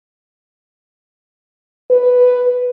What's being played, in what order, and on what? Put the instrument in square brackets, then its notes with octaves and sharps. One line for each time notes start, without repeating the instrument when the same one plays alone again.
[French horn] B4